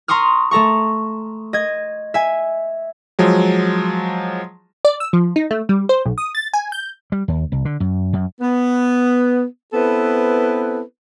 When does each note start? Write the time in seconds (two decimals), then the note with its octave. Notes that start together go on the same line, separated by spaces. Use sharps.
0.08 A#5 C6 C#6 D#6 F6
0.51 A3 A4 A#5 C#6
1.53 D#5 G#6
2.14 E5 G#5
3.19 F3 F#3 G#3
4.85 D5
5.00 E6
5.13 F3
5.36 D#4
5.51 A3
5.69 G3
5.89 C5
6.06 B1
6.18 D#6
6.35 A6
6.54 G#5
6.72 G6
7.12 G3
7.28 D#2
7.52 C2
7.65 D3
7.80 F#2
8.13 F#2
8.41 B3
9.73 B3 C4 E4 A4 B4